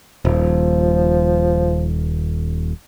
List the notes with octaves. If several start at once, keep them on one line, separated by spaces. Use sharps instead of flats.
D#1 F3